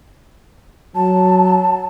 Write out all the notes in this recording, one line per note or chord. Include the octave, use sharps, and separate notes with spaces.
F#3 A5